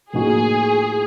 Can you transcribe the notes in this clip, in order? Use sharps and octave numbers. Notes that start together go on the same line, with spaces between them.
A2 F3 A#3 D#4 F#4 G#4